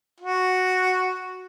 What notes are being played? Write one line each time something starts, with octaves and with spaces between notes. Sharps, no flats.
F#4